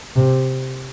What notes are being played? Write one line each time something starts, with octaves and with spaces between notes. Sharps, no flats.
C3